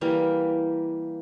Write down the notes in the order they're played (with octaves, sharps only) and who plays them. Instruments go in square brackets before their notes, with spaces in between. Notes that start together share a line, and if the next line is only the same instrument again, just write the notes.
[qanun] E3 G3 A#3